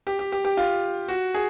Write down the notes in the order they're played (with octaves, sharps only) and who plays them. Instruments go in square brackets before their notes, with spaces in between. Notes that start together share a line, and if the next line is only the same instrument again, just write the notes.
[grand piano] G4
G4
G4
G4
F4
F#4
G#4